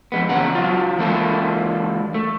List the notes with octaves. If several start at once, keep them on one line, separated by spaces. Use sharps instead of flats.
F2 G#3 B3
E2 A#2 C#3 F#5 A#5
F#3 F4
E3 G#3 A#3 E4 F4 A4
A3